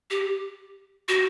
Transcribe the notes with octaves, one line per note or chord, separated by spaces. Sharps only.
G4
F#4